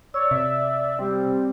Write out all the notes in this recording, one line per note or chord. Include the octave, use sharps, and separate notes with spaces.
C#5 D5 E6
C3 E5
G3 C4